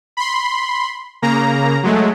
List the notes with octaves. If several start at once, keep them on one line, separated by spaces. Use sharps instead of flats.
B5 C6
C#3 A#3 A#5
F#3 G#3 A3